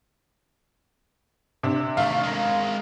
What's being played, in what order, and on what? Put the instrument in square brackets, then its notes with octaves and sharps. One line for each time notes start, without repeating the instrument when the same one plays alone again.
[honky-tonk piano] C3 D4
[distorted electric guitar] D#3 A3 [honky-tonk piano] F5
[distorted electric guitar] G#3 A#4